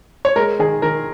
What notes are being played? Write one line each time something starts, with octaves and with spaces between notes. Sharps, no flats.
C#5
G#3 A#4
D#3 G#4
D#3 A#4